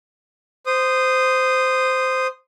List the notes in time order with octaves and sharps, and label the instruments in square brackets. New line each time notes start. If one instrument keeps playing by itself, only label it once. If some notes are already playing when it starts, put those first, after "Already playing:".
[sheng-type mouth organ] C5 D#6